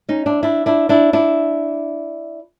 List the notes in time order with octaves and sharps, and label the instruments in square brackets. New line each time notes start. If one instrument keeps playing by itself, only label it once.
[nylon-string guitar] C#4 D#4
D4 E4
D4 E4
D4 E4
D4 E4
D4 E4